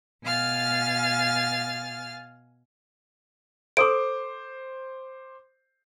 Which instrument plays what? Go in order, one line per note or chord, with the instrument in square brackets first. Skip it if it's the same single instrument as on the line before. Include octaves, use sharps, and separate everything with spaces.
[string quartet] B2 F5 G#5 F6 A6
[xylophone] A4 D#6 D7 [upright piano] C5 D6